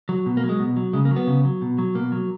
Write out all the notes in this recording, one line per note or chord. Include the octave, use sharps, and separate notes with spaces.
F#3
B2
A#3
F#3
G#3
B2
F#3
C#3 G#3
A#3
F#3
B3
C#3
F#3
B2
F#3
B2 A#3
F#3